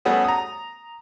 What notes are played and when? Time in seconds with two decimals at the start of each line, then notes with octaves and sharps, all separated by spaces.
0.05 G3 A3 B3 C#4 F#4 G#4
0.24 A#5 D#6